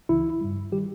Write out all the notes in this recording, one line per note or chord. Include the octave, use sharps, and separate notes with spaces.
C#2 C#3 E3 E4
G2 G3
D#3 G3 G4